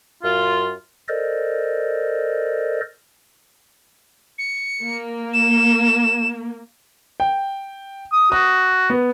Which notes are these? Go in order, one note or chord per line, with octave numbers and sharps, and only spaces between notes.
F#2 F4
A4 A#4 C5 D5 D#5
C#7
A#3
E7
G5
D#6
F#4 D#6
B3